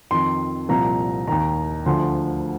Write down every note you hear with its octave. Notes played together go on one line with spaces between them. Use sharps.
F2 D#3 C6
C2 A#2 F3 A#5
D#2 D#3 A#5
D2 D3 F3 C6